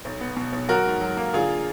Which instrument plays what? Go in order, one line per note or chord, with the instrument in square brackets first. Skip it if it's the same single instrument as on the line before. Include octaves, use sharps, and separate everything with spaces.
[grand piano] B1
B3
B2
B1
F#3 F#4 A#4
G#2
F#3
A#3
D3 F4 G#4